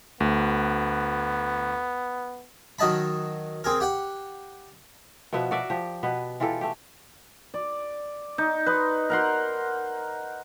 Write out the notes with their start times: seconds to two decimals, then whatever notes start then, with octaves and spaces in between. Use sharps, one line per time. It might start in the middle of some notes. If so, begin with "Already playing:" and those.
0.20 D2 B3
2.79 D#3 F#3 D#5 A5 B5
3.64 C4 G#4 A#4
3.80 G4 F#5 G5
5.33 B2 F3 B3 E5
5.51 F#4 A#4 D5 E5
5.70 F3 G4
6.03 B2 B3 B4
6.40 E3 F4 G4 A4
6.61 A3 G4
7.54 D5
8.38 D#4
8.66 B4 D#5 C6
9.10 A#4 F#5 C6